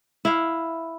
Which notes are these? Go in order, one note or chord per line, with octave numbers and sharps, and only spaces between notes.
E4 F5